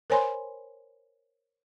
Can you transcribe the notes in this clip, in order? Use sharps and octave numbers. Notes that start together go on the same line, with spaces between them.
A#4 C5 C#5 G#5 B5 C6